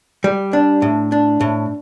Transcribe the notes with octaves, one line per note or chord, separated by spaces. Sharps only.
G3
D4
A2
D4
A2